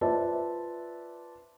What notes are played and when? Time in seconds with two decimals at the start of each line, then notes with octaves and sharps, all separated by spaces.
0.01 F4 B4 C5 D5 E5 A5